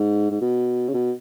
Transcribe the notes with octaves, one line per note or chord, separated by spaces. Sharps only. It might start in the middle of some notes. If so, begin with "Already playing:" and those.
Already playing: G#2
G#2
B2
C#3
B2